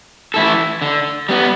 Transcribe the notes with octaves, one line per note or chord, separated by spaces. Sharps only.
E3 A3 E4 A4
D3
G3 B3